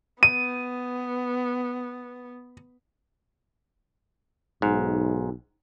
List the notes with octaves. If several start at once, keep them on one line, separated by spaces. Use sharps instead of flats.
B3 D#7
B1 G#2